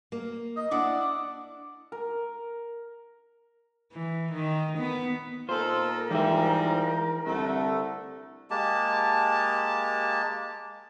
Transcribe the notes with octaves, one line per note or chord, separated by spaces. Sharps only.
A#3
D#5
D4 E4 D5 F#5
A#4
E3
D#3
B3
A#2 D#4 F4 A4 A#4 C5
G#2 E3 F3 G3 E5
C2 D3 A3
G#3 A#3 G4 A5